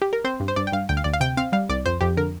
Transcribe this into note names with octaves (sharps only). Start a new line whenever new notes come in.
G4
A#4
C4 C5
G2
C5
G2 D5
G5
G2 F5
D2 G5
F5
D2 D5
F5
C3 G5
C4 F5
G3 F5
C2 D5
F2 C5
F2 G4
D3 A#4